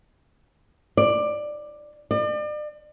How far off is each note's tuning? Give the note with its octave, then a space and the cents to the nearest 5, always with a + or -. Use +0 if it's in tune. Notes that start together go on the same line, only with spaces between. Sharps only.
D5 +15
D5 +40